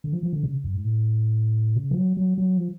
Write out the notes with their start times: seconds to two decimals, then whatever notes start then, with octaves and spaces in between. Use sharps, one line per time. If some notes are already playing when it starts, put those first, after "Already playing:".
0.04 D3
0.13 F3
0.23 F3
0.33 D3
0.43 C#3
0.64 F#2
0.74 G#2
0.84 A2
1.76 C#3
1.91 F3
1.97 F#3
2.17 F#3
2.38 F#3
2.58 F3